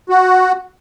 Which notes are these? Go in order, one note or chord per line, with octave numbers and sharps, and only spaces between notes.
F#4